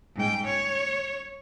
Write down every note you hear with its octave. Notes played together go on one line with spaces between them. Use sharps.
G#2 G5
C#5